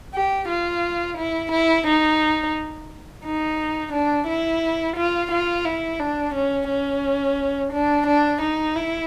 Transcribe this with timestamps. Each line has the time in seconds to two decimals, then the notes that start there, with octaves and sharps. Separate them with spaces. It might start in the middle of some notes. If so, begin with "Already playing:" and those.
0.14 G4
0.48 F4
1.17 E4
1.51 E4
1.86 D#4
3.25 D#4
3.93 D4
4.27 E4
4.96 F4
5.31 F4
5.65 E4
6.00 D4
6.35 C#4
6.69 C#4
7.72 D4
8.07 D4
8.41 D#4
8.76 E4